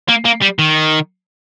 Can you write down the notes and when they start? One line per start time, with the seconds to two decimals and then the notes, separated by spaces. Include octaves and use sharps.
0.09 A#3
0.25 A#3
0.42 G3
0.59 D#3